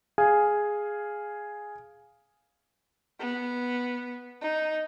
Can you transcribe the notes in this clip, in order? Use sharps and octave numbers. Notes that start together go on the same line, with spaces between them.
G#4 F5 G#5
B3
D#4